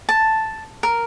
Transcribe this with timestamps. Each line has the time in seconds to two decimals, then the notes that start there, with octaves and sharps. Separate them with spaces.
0.09 A5
0.83 A#4